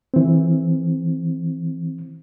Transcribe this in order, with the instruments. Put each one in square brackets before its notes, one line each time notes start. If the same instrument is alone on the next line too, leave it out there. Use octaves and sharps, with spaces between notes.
[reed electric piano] E3 C4